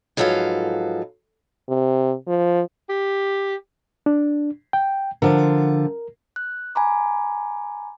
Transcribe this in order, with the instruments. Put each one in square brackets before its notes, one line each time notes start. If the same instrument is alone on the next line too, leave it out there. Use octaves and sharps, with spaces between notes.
[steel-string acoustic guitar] G#2 F3 F#3 A4 B4 F5
[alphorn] C3
F3
[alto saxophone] G4
[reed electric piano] D4
G5
[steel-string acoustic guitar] D3 F3 [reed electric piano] A#4
[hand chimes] F#6
G#5 A#5 B5 D6